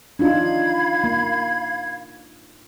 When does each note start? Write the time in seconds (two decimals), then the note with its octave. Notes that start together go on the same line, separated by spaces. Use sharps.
0.19 D4 D#4 F4 F5 B5 G#6
1.04 A#3